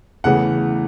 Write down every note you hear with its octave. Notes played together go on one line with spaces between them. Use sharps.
E2 C#3 E3 A3 F#5